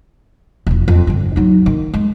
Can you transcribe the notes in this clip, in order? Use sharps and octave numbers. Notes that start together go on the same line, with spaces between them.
E1 F3
F2
G2 D3
F#3 D#4
D#3
G#3